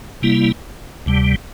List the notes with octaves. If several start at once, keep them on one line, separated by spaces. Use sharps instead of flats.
C3 G3 A#3 E4
D2 C3 G3